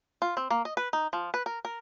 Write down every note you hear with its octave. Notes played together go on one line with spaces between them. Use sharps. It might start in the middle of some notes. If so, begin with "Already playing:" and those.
F4
C4
A#3
D#5
B4
D#4
F3
B4
A#4
A#4